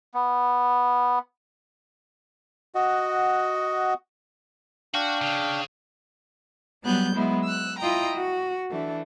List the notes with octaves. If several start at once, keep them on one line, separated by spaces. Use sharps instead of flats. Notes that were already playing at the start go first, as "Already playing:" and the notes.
B3
F#4 D#5 F#5
D4 F#4 F5 G5
C#3
F#3 G3 B3 F#6 G6
F#3 G#3 B3 E4
E6 F#6
E4 F4 D#5 G5 A#5
F#4
E3 A3 D4